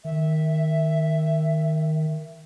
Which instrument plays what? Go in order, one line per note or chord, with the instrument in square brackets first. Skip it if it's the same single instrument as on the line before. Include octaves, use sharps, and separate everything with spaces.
[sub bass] D#3 [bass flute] E5